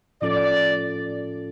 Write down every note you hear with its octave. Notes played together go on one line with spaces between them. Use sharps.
A2 F3 C#4 F4 A4 D5